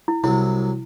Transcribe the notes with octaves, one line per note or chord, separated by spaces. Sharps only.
E4
C2 C3 F#3 E4